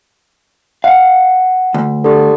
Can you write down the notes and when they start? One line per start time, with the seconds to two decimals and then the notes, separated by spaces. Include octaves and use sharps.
0.84 F5 F#5
1.74 D2
2.04 D3 G4 A4